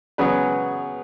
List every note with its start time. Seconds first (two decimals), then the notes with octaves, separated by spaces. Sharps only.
0.18 C#3 F#3 B3 C#4 G#4 B4